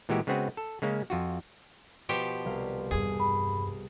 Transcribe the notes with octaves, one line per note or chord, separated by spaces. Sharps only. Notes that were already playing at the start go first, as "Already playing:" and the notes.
A#2 E3 G#3 F#4 G4
C#3 G#3 B3 C4 F#4 B4
A4
C#3 G#3 A#3 C#4
F2 F4 F#4
B2 F3 G4
C2 B4 F5
E2 G2 G#4
B5